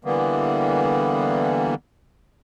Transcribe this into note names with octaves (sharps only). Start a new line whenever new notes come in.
D3 E3 G3 A#3 B3